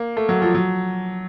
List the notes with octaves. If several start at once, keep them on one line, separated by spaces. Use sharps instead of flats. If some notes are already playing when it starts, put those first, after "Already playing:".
Already playing: A#3
A3
F#3
F3
F#3